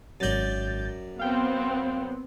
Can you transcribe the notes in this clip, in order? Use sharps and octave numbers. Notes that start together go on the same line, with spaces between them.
G#1 F#2 D5 G6 A6
B3 C4 F5 G5